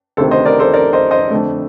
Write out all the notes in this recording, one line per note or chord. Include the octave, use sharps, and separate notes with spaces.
D2 C3 D#3 A4 C5
C5 D#5
A#4 D5
A4 C5
A#4 D5
C5 D#5
C5 D#5
F2 D3 A3